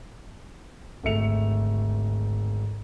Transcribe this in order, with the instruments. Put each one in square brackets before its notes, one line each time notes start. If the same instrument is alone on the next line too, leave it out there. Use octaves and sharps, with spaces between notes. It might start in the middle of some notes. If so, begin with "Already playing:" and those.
[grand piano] G#1 D2 A3 E5 C#7 F7